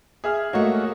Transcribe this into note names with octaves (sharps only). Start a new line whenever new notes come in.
G#4 E5 F6
A3 A#3 F#4 C#5 D#5